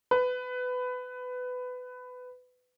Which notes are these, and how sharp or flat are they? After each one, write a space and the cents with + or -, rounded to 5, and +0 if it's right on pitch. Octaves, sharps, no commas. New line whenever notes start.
B4 +20